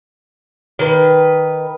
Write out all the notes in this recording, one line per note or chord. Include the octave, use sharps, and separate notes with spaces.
D#3 B4